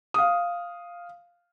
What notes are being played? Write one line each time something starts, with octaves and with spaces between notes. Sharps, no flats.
F5 D#6